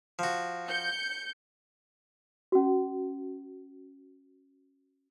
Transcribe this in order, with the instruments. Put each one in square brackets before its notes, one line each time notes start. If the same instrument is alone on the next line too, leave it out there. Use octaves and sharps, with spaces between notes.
[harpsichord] F3 F#4
[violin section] G6 C#7
[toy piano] C#4 F#4